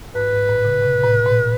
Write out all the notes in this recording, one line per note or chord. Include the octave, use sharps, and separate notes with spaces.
G#2 B4
G#2
A2
C#3
C3
A2
A#2